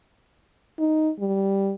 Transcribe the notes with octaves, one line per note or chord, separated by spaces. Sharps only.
D#4
G3